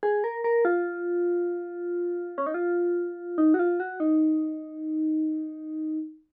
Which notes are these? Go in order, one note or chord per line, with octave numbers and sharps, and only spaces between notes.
G#4
A#4
A#4
F4
C#4
D#4
F4
D#4
F#4
F4
F#4
D#4